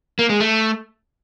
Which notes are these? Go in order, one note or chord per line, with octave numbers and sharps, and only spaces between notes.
A#3
G#3
A3